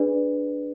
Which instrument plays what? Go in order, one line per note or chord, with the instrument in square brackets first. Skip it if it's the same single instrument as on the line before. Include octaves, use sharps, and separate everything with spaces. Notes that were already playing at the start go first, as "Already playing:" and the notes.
Already playing: [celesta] D4 G#4 B4 D5